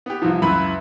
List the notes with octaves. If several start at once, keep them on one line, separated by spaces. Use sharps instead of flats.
B3 G4
C2 E3 F3
C#2 F#2 E4 B4 E5 B5